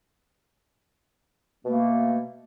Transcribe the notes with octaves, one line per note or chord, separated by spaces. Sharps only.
B2 A3 A#3